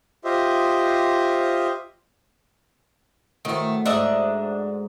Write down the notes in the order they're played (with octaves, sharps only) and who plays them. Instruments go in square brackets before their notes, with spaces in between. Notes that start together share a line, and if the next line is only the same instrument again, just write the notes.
[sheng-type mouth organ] F4 G4 C5 D#5 E5
[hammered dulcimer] A2 F#4 C5 [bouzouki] D#3 A3
[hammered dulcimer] G#2 A#5 [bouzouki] D4 D#5 E5